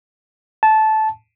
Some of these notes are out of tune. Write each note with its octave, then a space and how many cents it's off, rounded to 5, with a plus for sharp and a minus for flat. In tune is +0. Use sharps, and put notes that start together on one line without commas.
A5 -15